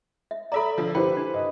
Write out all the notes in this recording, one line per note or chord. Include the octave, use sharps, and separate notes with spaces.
E5
A4 D5 E5 A#5 B5
D3 F3
E4 G4 B4 C5 G5
D4
D#5